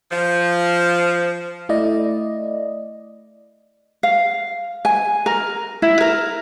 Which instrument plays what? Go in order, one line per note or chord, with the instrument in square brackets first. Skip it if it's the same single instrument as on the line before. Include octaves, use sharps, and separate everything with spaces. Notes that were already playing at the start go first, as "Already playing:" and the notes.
[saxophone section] F3
[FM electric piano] A3 E4 D5 D#5
[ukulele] F5
G#5
A#4
E4
A#4